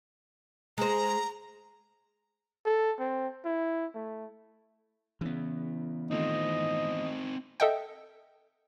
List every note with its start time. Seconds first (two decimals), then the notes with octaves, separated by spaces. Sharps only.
0.78 G#3 G#4 C5 A#5
2.66 A4
2.99 C4
3.45 E4
3.95 A3
5.21 C#3 E3 B3
6.11 D#3 A3 C4 D#4 F4 D#5
7.60 A4 D#5 E5 F#5 G5